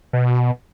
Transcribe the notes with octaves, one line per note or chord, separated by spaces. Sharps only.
B2